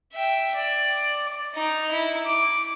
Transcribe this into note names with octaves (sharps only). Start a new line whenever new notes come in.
E5 G5
D5
D#4
E4
D6